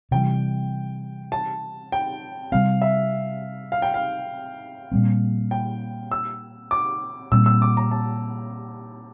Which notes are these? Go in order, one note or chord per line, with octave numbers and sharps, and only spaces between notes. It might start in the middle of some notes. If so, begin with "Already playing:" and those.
C3 E3 G3 G5
A5
G5
C3 G3 C4 F5
E5
F5
G5
F5
A#2 G3 C4
G5
E6
D6
A#2 G3 C4 E6
E6
D6
A#5
A5